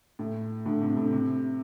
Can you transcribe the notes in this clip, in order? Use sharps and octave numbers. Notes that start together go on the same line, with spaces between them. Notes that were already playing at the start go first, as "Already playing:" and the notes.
A2
A2 D3
C3
A2
C3